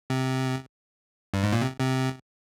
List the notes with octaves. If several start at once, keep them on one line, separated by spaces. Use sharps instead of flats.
C3
G2
G#2
A#2
C3
C3